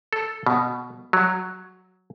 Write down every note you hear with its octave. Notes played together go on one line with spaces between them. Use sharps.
A4
B2
F#3